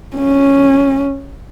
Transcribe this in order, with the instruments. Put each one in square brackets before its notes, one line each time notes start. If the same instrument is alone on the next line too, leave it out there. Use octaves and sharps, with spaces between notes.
[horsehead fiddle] C#4